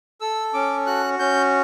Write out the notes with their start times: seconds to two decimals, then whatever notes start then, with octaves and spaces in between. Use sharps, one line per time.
0.21 A4 E6
0.54 C#4 D6
0.86 F#4 F#6
1.19 C#4 G6